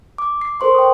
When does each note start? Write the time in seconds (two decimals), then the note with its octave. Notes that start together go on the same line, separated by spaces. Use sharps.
0.18 D6
0.41 C7
0.60 A4 A#4 C5 C6 C#6
0.74 G5 C#6 D#6